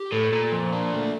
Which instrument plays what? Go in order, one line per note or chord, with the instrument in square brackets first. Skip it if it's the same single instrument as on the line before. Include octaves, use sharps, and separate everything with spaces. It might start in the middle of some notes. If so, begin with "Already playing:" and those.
Already playing: [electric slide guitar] G4
[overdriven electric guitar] A2 [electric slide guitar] A4
[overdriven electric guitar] A#2 [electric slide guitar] A4
[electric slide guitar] F3
D4
A3